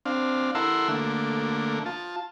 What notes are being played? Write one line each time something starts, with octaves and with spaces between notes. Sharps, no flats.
C4 D4 F5
E4 A4 A#4 F#5 C6 E6
D3 A3 A#3
F4 A5